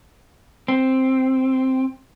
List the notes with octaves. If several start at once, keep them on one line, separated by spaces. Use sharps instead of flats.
C4